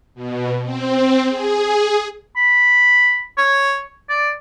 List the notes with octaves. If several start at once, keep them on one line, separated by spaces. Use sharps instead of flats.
B2
C4
G#4
B5
C#5
D5